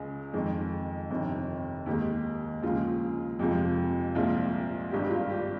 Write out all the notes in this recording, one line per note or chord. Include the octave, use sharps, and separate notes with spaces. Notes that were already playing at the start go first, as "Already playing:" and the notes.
Already playing: C#2 C#3 G#3
F2 D#3 G#3
G1 F2 C3 D#3
D#2 D#3 G#3 G4
D#2 C#3 F3 G#3 F4
F2 C3 F3 G#3
C2 A#2 F3 G#3 F4
G#1 G2 G3 G4
F4
G4